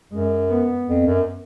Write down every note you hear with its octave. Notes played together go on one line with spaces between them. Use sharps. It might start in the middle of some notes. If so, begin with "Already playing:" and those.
F#2 G#3
B3
F2
F#2